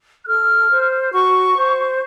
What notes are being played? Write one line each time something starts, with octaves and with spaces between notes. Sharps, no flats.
F#6
A4 F6
C5
F#4 C#6
C5